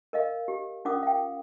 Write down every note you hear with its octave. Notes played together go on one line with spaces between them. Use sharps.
A#4 D#5 F5
G4
C#4 F4 A#4 F#5 D6 D#6
F5 G5